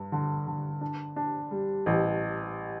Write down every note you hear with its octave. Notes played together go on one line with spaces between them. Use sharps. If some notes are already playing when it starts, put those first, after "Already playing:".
Already playing: G2
D3
D3
D4
D4
G3
A1